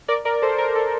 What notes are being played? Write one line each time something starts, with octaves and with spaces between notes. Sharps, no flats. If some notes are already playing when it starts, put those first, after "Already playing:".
A#4 D5
A#4 D5
A4 C5
A#4
A4